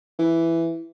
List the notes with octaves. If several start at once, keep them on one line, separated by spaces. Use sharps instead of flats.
E3